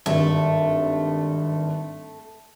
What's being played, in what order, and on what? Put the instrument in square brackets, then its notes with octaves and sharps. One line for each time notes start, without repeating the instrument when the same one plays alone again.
[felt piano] G#1 G2 [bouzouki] A3